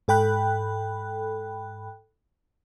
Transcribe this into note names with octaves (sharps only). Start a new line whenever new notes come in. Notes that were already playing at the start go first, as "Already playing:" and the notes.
G#2 A4 G5 B5 F#6